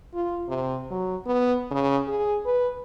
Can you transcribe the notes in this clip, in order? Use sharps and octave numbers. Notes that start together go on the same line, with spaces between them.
F4
C3
F#3
B3
C#3
G#4
B4